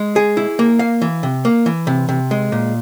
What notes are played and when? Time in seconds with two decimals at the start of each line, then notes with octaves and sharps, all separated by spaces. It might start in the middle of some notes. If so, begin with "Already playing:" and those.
Already playing: G#3
0.16 G#4
0.37 E4
0.59 A#3
0.79 F5
1.02 E3
1.23 C3
1.45 A#3
1.66 E3
1.87 C3
2.09 C3
2.31 G#3
2.52 A#2